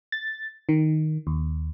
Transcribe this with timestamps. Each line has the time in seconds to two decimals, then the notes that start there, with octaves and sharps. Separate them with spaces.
0.12 A6
0.69 D#3
1.27 D#2